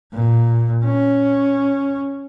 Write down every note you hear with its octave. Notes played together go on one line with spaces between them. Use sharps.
A#2
C#4